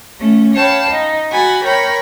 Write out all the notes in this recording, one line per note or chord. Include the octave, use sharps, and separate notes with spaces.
A3 C#4
C#5 F5 G5 A5 B5
D#4
F#4 F#5 G#5 B5 A6
A#4 C#5 G5 B5 C#6